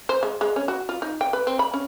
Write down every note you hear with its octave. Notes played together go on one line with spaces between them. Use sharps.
C5
G#3
G#3
C#4
F#4
F4
D#4
G5
B4
C4
B5
C#4